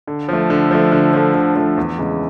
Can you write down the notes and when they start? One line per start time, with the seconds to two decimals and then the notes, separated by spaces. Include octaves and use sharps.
0.07 D3
0.29 F3 A3
0.50 D3
0.71 F3 A3
0.92 D3
1.13 F3 A3
1.34 D3
1.56 F3 A3
1.77 E2
1.98 C#3 E3 G#3